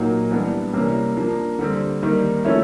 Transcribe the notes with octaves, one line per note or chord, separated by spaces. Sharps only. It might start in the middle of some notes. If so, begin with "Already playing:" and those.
Already playing: A#2 F#3 A#3 D#4
E3 G3 B3 D4
C3 E3 G3 A#3 C#4
F3 A#3 D4
D3 G3 C4
D#3 G3 A#3
F3 A3 C#4 E4